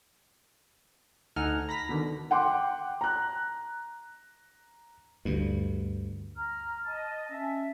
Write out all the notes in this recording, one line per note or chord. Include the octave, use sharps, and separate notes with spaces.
D2 D#4 A4 F#5 G#5 F6
A#5 B5 A#6 B6
B2 D3 D#3
F#5 G5 C6 D6
A#5 F#6
D2 G2
A#5 F6
D#5 A5
C#4 E5